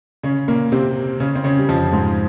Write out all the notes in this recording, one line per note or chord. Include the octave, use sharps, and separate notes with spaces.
C#3 C#4
A#2 A#3
C3 C4
C#3 C#4
C4
C#3 C#4
G3
F2 F3
G#2 G#3